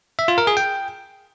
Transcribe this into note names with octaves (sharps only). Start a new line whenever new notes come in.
E5
F4
A#4
G#4
G5